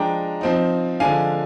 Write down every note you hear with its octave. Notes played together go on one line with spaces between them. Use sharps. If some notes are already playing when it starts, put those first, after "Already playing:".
Already playing: F3 G#3 D4 G5 A#5
F3 C4 D#4
D3 F3 G#3 D4 F5 G#5